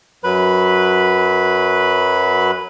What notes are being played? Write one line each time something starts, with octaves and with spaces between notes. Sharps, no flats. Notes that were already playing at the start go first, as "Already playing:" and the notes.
F#2 F#3 B4 B5